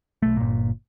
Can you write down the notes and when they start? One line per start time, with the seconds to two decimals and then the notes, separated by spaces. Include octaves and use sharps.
0.22 B1 A3
0.36 G1 A#2